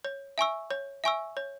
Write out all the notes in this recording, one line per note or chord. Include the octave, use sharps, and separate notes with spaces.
C#5
E5 G#5 C#6 E6
C#5
E5 G#5 C#6 E6
C#5